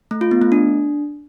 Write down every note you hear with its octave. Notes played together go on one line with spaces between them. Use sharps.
A3
F4
B3
A3
D4